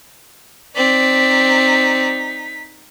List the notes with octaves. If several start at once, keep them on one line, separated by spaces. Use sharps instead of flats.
C4 D#4 D5 B6